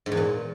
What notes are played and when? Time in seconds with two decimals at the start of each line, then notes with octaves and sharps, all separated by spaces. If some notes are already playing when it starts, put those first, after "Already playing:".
0.06 G#2
0.12 E2
0.17 A#2